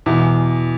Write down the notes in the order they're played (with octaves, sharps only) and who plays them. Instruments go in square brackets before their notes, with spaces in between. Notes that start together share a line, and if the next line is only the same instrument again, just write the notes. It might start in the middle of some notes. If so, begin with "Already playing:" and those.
[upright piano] E2 [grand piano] B2 E3